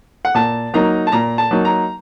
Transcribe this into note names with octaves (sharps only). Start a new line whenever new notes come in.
F#5
A#2 A5
F#3 A#3 D#4 A#5
A5
A#2 A#5
A5
F#3 A#3 D#4
A#5